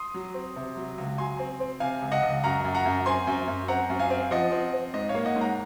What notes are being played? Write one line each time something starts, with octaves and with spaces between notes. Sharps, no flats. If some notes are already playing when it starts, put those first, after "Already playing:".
Already playing: C6 D#6
F#3
C4
C3
F#3
C#2
F#3 G#5 C6
C4
C4
C3 F5 G#5
C#2
D#5 F#5
C#2
F#2 F#5 A#5
F#2
F#5 A#5
F#2
C4 G#5 C6
F#2
F#2
C4 F#5 A#5
F#2
F5 G#5
C4
F3 D#5 F#5
C4
C4
G#2 D#5
C#5 F5
A#3
D#5 F#5
G#2
F#5 A#5